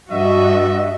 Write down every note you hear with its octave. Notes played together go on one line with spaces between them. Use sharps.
G2 F#4 D#5 E5